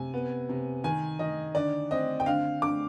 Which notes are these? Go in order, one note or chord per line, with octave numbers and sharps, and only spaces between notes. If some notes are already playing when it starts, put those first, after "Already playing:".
Already playing: C3 G#5
B3
C3
D#3 G#5
D#3 D#5
D3 D5
C4 D#5
G5
D3 F5
D3 D6